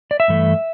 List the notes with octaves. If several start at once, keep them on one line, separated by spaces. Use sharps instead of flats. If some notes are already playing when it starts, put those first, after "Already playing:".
D5
E5
G2 E3 A3